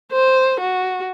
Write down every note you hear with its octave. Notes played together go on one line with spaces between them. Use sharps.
C5
F#4